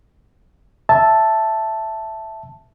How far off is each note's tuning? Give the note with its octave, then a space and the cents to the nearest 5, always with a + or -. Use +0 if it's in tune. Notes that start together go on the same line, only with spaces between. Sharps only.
E5 +0 A5 +0